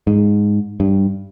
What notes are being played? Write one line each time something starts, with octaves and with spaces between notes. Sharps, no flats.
G#2
G2